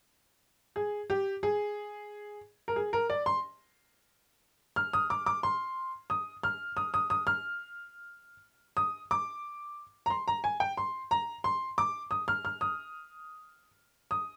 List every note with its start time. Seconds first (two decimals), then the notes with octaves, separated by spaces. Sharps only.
0.76 G#4
1.10 G4
1.43 G#4
2.68 A#4
2.76 G#4
2.93 A#4
3.10 D5
3.26 C6
4.76 F6
4.93 D#6
5.10 D6
5.26 D6
5.43 C6
6.10 D#6
6.43 F6
6.77 D#6
6.94 D#6
7.10 D#6
7.27 F6
8.77 D#6
9.11 D6
10.06 A#5
10.10 C6
10.28 A#5
10.44 G#5
10.60 G5
10.77 C6
11.11 A#5
11.44 C6
11.78 D6
12.11 D#6
12.28 F6
12.45 F6
12.61 D#6
14.11 D#6